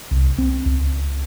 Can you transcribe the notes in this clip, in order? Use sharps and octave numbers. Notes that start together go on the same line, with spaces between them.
C2
C4
C#2